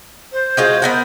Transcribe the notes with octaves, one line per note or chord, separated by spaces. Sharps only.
C5
G#3 F4 F#4
B3 A#4 F#5